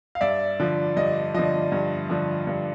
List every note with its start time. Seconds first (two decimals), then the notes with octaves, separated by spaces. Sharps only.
0.15 F5
0.21 G2 D5 E5
0.60 D3 F3
0.96 G2 D#5
1.34 D3 F3 D#5
1.72 G2
2.10 D3 F3
2.47 G2